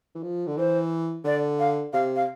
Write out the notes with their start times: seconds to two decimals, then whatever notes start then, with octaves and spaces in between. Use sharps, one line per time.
0.15 E3
0.23 F3
0.47 D3
0.57 E3 C5
1.25 D3 D5
1.59 F5
1.93 C3 F5
2.15 F5